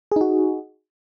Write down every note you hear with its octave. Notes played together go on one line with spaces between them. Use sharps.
D#4 F#4 G#4